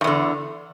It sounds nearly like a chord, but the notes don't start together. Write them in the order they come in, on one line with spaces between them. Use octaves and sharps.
G2 E2 D3